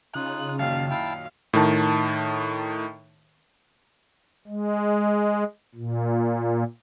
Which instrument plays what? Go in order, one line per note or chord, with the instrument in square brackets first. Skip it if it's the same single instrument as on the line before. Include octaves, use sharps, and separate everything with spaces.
[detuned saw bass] C#3 [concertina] D#4 F4 D#6 [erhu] F#6
[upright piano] F#2 A#2 D#3 [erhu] F5 [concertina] A5
[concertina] E4 G5 A5 [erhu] F5
[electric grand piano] A2 D#3 A5
[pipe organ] G#3
A#2